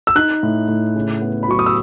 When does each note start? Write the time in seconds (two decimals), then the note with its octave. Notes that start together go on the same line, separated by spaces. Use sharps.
0.07 E6
0.15 D#4 F#6
0.43 A2
0.68 A2
0.95 C#3
1.22 B3
1.43 B5
1.48 F#3 C#6
1.59 D#6
1.66 E6